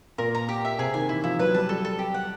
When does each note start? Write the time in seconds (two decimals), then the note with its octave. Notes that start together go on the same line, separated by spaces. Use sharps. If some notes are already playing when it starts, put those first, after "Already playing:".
0.18 A#2 A#4
0.35 A#5
0.49 G4
0.65 E5
0.78 C3 G#4
0.94 D#3 G#5
1.09 E3 E4
1.24 F3 E4
1.39 F#3 B4
1.54 G3 A5
1.69 G3 A4
1.85 A4
1.99 G4
2.14 F#5